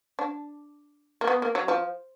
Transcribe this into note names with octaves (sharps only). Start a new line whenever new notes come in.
D4
A#3
B3
A#3
F#3
F3